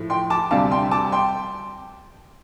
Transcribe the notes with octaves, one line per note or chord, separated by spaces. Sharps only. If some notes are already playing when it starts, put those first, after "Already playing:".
Already playing: A2 F3 A3
G5 C6
A5 D6
D2 C3 G3 F5 A5
G5 C6
A5 D6
G5 C6